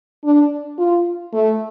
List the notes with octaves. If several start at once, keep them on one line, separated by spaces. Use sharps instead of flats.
D4
F4
A3